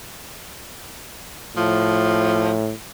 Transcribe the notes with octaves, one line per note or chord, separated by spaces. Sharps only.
A2 F3